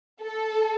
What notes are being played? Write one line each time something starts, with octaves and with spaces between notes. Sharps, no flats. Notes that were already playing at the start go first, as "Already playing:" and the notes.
A4